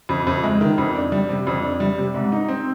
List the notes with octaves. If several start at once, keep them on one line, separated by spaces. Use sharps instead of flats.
F2
F2
G#3
D#3
F2
D4
G3
C3
F2
D4
G3
C3
G#2
D#4
C4